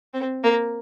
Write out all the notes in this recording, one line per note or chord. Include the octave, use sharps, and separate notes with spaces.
C4
A#3